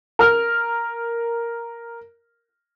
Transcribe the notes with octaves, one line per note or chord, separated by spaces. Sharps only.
A#4 F6